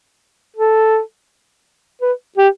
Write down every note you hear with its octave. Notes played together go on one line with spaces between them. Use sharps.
A4
B4
G4